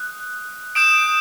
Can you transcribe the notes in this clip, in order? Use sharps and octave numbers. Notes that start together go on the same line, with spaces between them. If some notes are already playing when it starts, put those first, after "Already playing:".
Already playing: D#6 F#6
D#6 G6 D7 E7